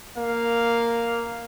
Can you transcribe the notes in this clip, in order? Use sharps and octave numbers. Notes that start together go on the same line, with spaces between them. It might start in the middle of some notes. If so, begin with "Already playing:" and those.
A#3 F5